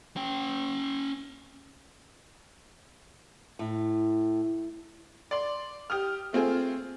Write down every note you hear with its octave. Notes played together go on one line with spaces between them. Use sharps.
C#4 G5
A2
D5 C6
G4 D#6 F6
A3 C4 F4 G#4